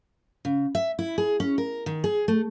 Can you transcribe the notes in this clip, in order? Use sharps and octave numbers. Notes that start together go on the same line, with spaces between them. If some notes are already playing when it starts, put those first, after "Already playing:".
C#3
E5
E4
G#4
C#4
A#4
D#3
G#4
A3